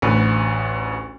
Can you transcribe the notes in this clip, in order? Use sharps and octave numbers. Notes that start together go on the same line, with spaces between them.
A1 D2 B4